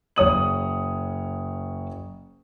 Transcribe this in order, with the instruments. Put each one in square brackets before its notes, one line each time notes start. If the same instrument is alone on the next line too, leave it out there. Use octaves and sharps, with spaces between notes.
[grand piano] F#1 C#5 D#6 F#7